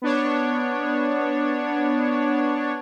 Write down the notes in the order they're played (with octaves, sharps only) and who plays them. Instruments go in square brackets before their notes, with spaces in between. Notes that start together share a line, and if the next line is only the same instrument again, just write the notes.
[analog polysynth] B3 D4 C#5